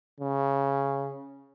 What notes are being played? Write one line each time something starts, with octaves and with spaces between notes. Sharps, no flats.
C#3